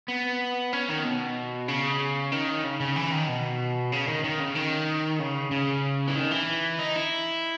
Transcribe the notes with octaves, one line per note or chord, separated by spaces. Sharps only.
B3
C#4
D#3
B2
C#3
D#3
C#3
C#3
E3
D#3
B2
C#3
D#3
D#3
C#3
D#3
C#3
C#3
E3
D#3
E3
D#4
E4